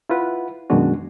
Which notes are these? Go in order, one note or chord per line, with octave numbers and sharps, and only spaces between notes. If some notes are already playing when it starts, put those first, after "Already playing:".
E4 F4 B4 F#5
F#2 B2 D#3 G#3 D4 F#4